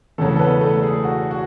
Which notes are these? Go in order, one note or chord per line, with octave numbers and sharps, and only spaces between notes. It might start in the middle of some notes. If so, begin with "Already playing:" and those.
E1 E2 C#3 F#3 A3 A4
A4
B3 B4
A3 A4
G#4
F#4
F#4